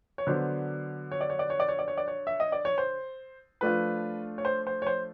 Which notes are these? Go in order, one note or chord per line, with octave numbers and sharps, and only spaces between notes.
C#5
D3 F#3 B3 D4 C5
C#5
D5
C#5
D5
C#5
D5
C#5
D5
C#5
D5
C#5
E5
D#5
D5
C#5
C5
F3 A3 D4 F4 B4
C#5
C5
C5
C#5
C5